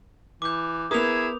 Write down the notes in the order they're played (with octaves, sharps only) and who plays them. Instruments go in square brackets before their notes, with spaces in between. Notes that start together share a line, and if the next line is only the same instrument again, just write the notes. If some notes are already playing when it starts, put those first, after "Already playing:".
[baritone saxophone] E3 [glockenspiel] D6 G6
[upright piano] B3 A#4 [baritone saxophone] E4 [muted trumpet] G#4 [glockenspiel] D#6 F7